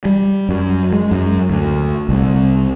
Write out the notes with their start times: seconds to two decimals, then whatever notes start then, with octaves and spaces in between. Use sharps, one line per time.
0.05 G3
0.49 F#2
0.93 G#3
1.11 F#2
1.50 D2
2.09 C2